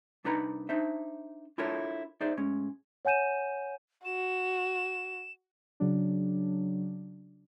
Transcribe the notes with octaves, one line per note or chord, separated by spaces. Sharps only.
C2 D4 D#4 B4 A#5 B5
D4 D#4 C5 E5
D4 E4 F4 A4 A#4 C#5
D#4 G#4 C5 D5 E5
A2 G#3 C#4
C#5 F#5 G#5 G6 D#7 E7
F#4 E7
C#3 F#3 D4